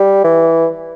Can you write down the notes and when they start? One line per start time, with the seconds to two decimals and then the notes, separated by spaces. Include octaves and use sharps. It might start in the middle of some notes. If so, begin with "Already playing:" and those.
Already playing: G3
0.24 E3